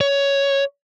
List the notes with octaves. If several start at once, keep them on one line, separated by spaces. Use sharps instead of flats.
C#5